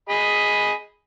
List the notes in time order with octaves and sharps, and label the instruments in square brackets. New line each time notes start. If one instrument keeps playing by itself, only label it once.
[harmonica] G#4 D#5 B5